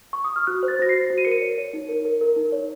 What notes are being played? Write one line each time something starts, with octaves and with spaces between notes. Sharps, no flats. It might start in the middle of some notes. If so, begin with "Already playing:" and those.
C#6
D#6
F6
F#4 F#6
C5
A6
F#4 A#6
C7
C5
F#4
D#7
A#4 C#7
D#7
C#5
C#5
D#4
A#4
A#4
A#4
D#4
C#5